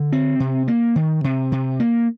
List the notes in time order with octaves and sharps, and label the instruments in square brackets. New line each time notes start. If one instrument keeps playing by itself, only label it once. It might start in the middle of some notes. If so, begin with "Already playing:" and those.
Already playing: [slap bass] D3
C4
C3
A#3
D#3
C3
C3
A#3